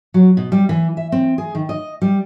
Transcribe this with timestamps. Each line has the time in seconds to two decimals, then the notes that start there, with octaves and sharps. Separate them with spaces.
0.14 F#3
0.37 B2
0.52 G3
0.69 E3
0.97 E5
1.12 C4
1.38 G#4
1.55 D#3
1.69 D#5
2.02 G3